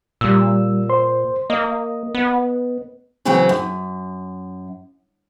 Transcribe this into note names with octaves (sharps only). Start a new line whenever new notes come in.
A#2 G3 E6
C5 C6
A#3 D#5
B3
C#3 E3 F#3 B3 C4
F#2